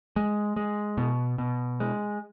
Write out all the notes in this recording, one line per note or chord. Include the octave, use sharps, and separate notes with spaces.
G#3
G#3
B2
B2
G#3